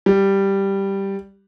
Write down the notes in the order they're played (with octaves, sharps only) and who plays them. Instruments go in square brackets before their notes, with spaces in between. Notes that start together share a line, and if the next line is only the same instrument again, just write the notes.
[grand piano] G3